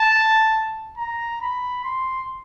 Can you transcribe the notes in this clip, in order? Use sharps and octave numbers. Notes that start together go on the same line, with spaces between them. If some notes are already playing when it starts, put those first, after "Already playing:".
Already playing: A5
A#5
B5
C6